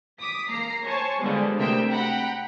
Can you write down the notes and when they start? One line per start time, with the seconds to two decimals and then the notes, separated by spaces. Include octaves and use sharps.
0.21 D6 D#6 B6
0.50 A#3 A#5 C7
0.86 C5 C#5 G#5 A5 C#6
1.22 D3 F3 G3 G#3 B3
1.57 D2 C3 C4 A#4 E5 G5
1.90 F#5 G5 A#5 B5